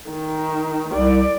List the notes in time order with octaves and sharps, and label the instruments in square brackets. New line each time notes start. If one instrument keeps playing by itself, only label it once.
[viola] D#3
[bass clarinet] C2 [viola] D5